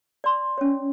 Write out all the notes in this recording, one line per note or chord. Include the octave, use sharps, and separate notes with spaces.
D5 C6
C#4 C#5